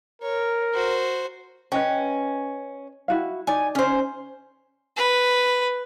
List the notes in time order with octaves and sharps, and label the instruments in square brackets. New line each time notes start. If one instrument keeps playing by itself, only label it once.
[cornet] A#4 [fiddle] C#5
[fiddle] F#4 C5
[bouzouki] C#4 [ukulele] B4 D#5 G5
[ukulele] E4 F#4 F5
[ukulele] D#4 D5 [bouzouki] G#5
[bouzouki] C#4 C5
[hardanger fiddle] B4